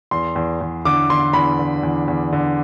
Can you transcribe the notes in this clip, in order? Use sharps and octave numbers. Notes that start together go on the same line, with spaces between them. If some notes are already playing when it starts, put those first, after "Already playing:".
E2 C6
E2
E2
D3 D6
D3 C6
E2 B5
D3
E2
E2
D3